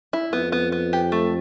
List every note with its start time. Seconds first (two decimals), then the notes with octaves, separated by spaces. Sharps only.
0.13 E4
0.33 F2 B3
0.52 B3
0.72 B3
0.93 G4
1.12 A3